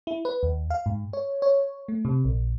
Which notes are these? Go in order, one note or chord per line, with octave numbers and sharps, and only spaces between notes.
E4
B4
D#2
F5
G#2
C#5
C#5
A3
C3
A#1